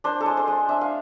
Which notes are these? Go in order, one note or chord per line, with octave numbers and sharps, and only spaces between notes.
D4 C5
A4
G#3
C5
G#3
D4 E5
F5